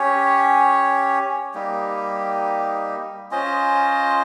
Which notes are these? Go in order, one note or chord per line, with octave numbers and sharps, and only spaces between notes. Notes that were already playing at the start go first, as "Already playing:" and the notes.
Already playing: C#4 G4 C#5
G3 A#3 D#4 G4
C#4 F4 C5 D#5